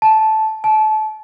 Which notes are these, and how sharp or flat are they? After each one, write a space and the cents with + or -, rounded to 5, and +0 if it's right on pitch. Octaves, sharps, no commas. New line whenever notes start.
A5 -10
A5 -30